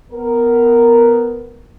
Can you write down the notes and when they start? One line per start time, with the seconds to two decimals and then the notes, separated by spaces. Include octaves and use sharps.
0.12 B3 A#4